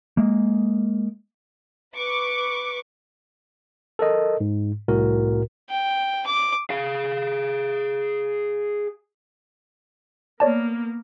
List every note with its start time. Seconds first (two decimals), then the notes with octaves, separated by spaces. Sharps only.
0.17 G#3 A#3
1.96 B4 C#6 D6
3.99 A4 A#4 D#5
4.40 G#2
4.88 C2 A2 F#4 A#4
5.70 G5
6.27 D6
6.70 G#4 F5
10.40 A#3 B3 C#5 D5 A5